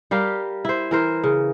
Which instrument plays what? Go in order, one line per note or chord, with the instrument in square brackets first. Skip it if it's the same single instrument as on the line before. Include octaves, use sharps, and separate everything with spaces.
[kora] G3 G4 A#4 F5
E4 C5
E3 A#4 C5
C#3